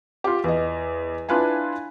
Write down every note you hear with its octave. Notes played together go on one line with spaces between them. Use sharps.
F4 G4
E2 D#5
D4 E4 F4 B4 F5 G#5